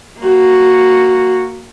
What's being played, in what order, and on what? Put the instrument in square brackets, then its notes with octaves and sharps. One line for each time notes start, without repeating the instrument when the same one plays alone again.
[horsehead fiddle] A#3 F#4